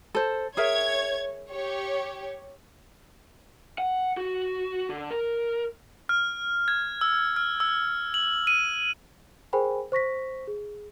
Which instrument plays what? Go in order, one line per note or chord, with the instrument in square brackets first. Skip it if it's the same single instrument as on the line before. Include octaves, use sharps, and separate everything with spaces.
[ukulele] A4 C5
[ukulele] G#4 A#4 E5 [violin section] C#5 G#6
[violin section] G4 C#5
[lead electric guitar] F#5
F#4
D3
A#4
[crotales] F6
G#6
E6
F6
E6
F#7
D#7
[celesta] G#4 A#4 C5 G5 G#5 B5
C5 C#6 A#6 B6
G#4